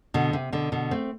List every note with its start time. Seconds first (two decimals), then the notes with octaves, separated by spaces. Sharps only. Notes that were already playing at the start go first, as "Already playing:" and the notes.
0.14 B2 D3
0.33 C3
0.52 B2 D3
0.72 B2 D3
0.91 A3 C4